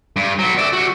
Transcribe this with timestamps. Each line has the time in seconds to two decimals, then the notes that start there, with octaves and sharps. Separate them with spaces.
0.16 G2
0.39 F#3 B3
0.58 D5 E5
0.73 G3 F#4